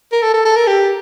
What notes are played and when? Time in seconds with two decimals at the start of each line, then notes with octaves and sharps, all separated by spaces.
0.12 A#4
0.22 A4
0.34 A4
0.45 A4
0.56 A#4
0.67 G4